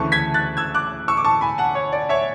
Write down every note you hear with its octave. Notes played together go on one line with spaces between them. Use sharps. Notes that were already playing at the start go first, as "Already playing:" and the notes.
Already playing: D2 C#3 E3 A3 A5 C#6
G#6 B6
F#6 A6
E6 G#6
D6 F#6
C#6 E6
D6
A5 C#6
G#5 B5
F#5 A5
C#5
D5
C#5 E5